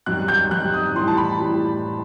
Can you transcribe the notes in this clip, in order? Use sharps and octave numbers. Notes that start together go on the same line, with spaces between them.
F#2 D#3 G3 F#6
G6
F#2 D#3 G3 F#6
D#6
A2 E3 G3 C6
A5
B5
A2 E3 G3